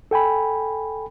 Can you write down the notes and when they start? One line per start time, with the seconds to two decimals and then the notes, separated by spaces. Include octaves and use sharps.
0.11 A4 G5 G#5 B5